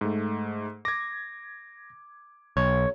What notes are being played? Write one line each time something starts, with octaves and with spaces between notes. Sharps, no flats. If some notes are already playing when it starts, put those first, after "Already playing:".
G#2 A3
D6 G#6 A#6
B1 C#5